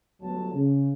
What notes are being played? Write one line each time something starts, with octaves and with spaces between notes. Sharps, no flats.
G1 D2 F#3 A5
C#3